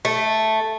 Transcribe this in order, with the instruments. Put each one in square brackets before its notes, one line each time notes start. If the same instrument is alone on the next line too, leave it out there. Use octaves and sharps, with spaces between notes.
[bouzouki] A3